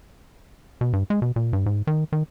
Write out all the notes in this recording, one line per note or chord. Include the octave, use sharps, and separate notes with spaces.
B2
G2
G#3
B2
A#2
G2
G#2
D#3
D#3